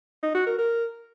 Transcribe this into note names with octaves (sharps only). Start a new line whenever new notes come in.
D#4
F#4
A#4
A#4